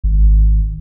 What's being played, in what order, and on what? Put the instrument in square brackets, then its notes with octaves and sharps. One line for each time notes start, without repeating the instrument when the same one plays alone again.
[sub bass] G#1